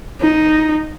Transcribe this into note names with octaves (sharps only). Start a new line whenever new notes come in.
D#4